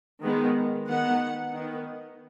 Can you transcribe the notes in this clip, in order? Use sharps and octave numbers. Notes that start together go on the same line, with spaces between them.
D#3 G#3 B3
D#3 B3 F#5
D#3 B3